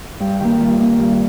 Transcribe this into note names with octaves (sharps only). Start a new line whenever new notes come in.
G2 G4
D#3 A#3 G4
G2 F4
D#3 A#3
G2